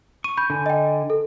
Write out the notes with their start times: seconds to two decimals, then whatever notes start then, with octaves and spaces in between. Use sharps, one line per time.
0.24 C#6 D#7
0.37 B5 G6
0.50 D3 G#5
0.66 D#5 G5
1.10 A4